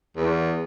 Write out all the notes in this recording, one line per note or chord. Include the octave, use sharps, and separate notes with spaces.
E2